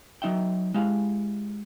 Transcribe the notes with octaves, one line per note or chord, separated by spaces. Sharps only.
F#3 D#4 E5 G5
G#3 E4 G4 F5